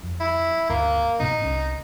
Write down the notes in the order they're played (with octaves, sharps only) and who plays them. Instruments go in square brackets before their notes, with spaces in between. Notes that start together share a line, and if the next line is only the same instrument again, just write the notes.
[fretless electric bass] F2
[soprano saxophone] E4
[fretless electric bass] D2 G2 [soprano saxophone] A#3
[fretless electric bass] A2 C3 B3 [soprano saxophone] D#4
[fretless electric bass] C2 C#4